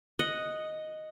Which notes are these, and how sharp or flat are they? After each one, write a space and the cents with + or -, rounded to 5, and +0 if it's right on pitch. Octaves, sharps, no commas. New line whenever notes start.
D#5 +0 F#5 +0